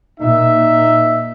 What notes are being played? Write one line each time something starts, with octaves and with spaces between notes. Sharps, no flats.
A#2 D#4 E5